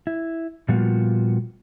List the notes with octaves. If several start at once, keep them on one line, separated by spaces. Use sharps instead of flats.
E4
A#2 F3 G3 B3 F4 F#4